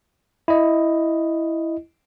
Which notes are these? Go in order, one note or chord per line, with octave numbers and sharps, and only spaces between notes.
E4 D#5